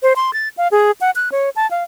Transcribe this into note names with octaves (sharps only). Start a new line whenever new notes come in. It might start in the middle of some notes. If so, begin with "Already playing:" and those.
C5
C6
A6
F5
G#4
F#5
F#6
C#5
A5
F5